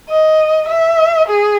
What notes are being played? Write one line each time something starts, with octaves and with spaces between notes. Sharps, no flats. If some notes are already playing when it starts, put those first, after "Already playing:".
D#5
E5
G#4